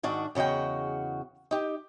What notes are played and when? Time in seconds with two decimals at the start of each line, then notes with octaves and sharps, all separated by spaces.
0.03 G#2 D#3 D4 F#4
0.35 E2 C#3 F#4 D#5 G5
1.51 D#4 G4